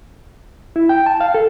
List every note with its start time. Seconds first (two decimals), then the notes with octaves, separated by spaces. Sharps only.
0.76 E4
0.89 G5
1.06 A5
1.21 F5
1.34 A4